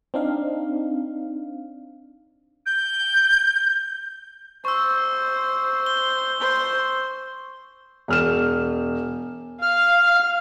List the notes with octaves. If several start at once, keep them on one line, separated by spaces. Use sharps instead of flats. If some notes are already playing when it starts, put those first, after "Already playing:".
C4 D4 D#4 F5
G6
C5 C#6 E6
G7
C5
E1 F6 E7
F5 F6